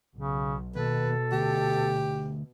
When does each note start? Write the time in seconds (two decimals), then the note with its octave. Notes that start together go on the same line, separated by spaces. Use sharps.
0.15 B1 C#3
0.75 D#2 B2 A4 B4
1.32 D2 G4